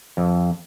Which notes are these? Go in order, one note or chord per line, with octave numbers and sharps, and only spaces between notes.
F2